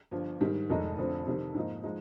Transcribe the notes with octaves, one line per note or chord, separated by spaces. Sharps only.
G1 G2 F3
G#2 D#3 G3
F1 F2 D#3 G#3 D#4
F1 F2 D3 F3 C4
F2 C3 D#3
G#2 F3 A#3 D#4
F3 G#3 D#4